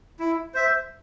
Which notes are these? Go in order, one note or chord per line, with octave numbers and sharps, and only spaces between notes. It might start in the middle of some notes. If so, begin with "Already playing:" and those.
E4
C5 E5